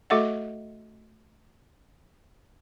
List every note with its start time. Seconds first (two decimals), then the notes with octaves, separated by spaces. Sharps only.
0.10 A3 F#4 A4 D#5 E5 F#5